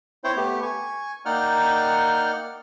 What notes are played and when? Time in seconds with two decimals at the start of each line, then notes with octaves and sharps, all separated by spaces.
0.24 C4 E4 C5 C#5 G5
0.37 A3 B3 G4
0.62 G#5 C#6
1.25 A#3 D#4 D5 F#5 G5 F6